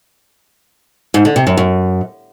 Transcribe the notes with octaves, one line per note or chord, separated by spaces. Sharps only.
G#2
D3
C3
F#2
F#2